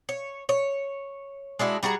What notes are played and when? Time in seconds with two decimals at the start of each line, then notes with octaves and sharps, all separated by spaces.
0.09 C#5
0.49 C#5
1.59 G#3 D4 E4 F#4
1.83 G3 F#4 G#4 A#5